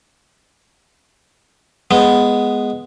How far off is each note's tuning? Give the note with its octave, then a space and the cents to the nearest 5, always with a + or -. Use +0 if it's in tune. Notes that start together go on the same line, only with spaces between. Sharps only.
G#3 +0 B3 +0